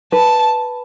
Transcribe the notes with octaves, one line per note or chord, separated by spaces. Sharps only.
B4 A5